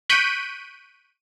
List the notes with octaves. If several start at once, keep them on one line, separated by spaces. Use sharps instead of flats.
C#6 F#6 G6 B6 D7 D#7